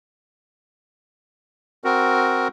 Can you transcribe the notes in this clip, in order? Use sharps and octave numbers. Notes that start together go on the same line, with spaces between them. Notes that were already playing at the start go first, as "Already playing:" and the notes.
C4 F#4 A#4